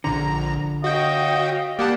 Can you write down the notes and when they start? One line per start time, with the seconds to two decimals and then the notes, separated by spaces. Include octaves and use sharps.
0.04 A#1 D3 A#5
0.84 F#4 D#5 F5 G5
1.79 A#3 G4 D5 F#5 A5